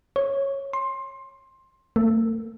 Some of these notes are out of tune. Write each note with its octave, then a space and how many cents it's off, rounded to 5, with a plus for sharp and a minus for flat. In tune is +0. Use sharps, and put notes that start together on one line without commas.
C#5 -10
C6 +15
A3 +45